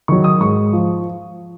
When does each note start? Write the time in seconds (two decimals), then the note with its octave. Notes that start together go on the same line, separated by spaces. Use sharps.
0.08 D#3 F#3 C#6
0.24 D#6
0.40 G#2 C#6
0.73 F3